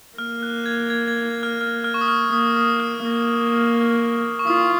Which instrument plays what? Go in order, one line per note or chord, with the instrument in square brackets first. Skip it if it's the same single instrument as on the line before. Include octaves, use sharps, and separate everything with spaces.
[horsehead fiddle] A#3 [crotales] F6
[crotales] F#6
G#6
G#6
G#6
F6
F6
F6
C#6
D#6
F6
[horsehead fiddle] A#3 [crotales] D#6
[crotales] D#6
F6
[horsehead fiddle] A#3
[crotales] C#6
[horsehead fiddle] F4 [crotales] D#6